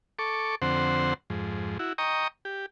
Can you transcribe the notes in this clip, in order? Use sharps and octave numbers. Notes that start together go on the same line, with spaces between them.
A4 C#6 D6
F2 D3 C4 C5 F#5
F2 G#2
E4 F#4
D#5 G5 A#5 C#6 D#6
G4